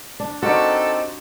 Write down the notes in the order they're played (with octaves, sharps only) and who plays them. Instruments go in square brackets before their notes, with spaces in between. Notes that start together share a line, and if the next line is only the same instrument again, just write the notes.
[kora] D4
[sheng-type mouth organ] C4 D#4 [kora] F#4 [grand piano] G4 A#4 D5 [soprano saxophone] A4